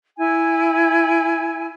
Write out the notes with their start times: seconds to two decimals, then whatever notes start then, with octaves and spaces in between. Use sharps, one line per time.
0.17 E4 G#5